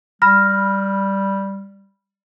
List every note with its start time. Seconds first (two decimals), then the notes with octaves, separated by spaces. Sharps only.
0.22 G3 B5 F6 A#6